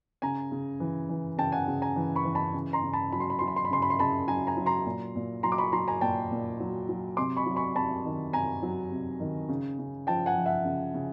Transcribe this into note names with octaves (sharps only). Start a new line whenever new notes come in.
C#3 G#5 A#5
C#3
E3
E3
C#3 G5 A5
F#5 G#5
C#3
G#5 A#5
E3
B5 C#6
E3
A5 B5
C#3
A#5 C6
C#3
A5 B5
F#3 B5
C6
B5
F#3 C6
B5
C6
B5
C#3 C6
B5
C6
C#3 A5 B5
F#3 G#5 A#5
G#5 A#5
F#3
A#5 C6
A#2
A#2
F#3 A#5 C6
D6
B5 C#6
F#3 A#5 C6
G#5 A#5
A#2 G5 A5
A#2
F#3
F#3
C3 C6 D6
B5 C#6
F#3
B5 C#6
C3 A5 B5
D#3
C3 G#5 A#5
F#3
C3
D#3
C#3
C#3
F3 G5 A5
F#5 G#5
F3
E5 F#5
C#3
C#3